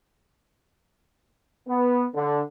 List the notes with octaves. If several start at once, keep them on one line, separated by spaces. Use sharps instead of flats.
B3
D3